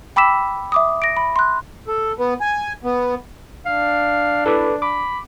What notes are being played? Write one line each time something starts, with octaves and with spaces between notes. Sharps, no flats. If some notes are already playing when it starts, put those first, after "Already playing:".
G5 B5 D6 E6 B6 E7
E5 D6 D#6
A#6 D7
B5
C6 F#6
A4
B3
G#5
B3
D4 F5
E4 A4 B4 D6
B5 D6